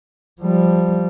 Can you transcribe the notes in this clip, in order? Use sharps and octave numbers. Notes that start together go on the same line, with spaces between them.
F3 G3